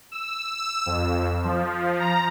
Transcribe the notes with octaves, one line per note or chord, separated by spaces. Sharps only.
E6
E6
F2
F3
A#5